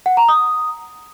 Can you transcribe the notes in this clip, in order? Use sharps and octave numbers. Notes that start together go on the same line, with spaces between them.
F#5
A#5
D#6